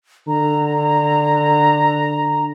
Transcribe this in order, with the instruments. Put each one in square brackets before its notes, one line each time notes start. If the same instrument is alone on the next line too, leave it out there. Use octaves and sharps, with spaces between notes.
[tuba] D3 [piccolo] A#5